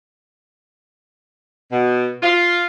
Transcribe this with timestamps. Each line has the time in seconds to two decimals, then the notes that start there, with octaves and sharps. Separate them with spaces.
1.72 B2
2.23 F4